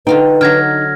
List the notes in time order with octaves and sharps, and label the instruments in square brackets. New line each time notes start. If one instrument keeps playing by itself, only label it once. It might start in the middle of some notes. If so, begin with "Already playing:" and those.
[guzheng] D3 F4 G5 [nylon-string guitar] D#4 [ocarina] B4
[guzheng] D3 F#3 [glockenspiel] F6 G#6 A#6